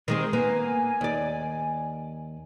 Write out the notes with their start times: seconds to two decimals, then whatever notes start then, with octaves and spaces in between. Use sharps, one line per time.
0.08 D#3 G#3 C4
0.33 A#3 B3 G#5
1.01 D#2 D5